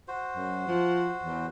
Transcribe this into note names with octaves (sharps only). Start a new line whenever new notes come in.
F#4 C5
F#2
F3
E2